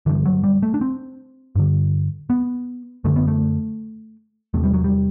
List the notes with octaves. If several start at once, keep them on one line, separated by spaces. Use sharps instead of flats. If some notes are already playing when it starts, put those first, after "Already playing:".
G2 D3 E3
F#3
G3
A3
D4
C4
G2 D3
B3
F#2 D3 A3
B3
A3
E2 C3 A3
G3
F#3
G3